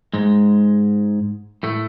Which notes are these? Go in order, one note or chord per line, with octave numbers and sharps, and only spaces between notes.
G#2 G#3
A2 A3